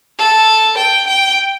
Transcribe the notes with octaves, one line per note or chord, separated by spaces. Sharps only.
A4
G5
G5